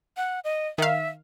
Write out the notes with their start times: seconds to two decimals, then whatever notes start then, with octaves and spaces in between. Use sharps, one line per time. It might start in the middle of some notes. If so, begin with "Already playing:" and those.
0.17 F#5
0.44 D#5
0.78 D#3 E5 F5